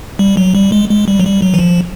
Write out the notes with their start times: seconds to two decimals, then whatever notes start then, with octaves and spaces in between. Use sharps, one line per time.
0.19 G3
0.37 F#3
0.55 G3
0.72 G#3
0.90 G#3
1.08 G3
1.20 F#3
1.25 G3
1.42 F#3
1.54 E3
1.59 F3